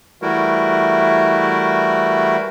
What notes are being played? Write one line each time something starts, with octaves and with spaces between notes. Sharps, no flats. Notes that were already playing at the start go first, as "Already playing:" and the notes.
E3 G3 A3 E4 F#4 A#4